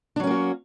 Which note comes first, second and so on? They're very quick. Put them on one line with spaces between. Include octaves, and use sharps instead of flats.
D4 F#3 C#4 A#3 F#4